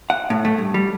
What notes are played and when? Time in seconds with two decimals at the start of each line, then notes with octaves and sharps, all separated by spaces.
0.10 F#5
0.30 A2
0.45 A3
0.58 G2
0.74 G3